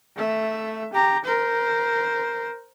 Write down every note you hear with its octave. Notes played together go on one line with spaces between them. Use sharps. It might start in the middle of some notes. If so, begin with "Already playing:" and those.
A3 E5
G4 A#5
A#4 C5